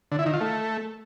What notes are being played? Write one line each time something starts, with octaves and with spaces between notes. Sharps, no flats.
D3
E4
D#3
F4
A3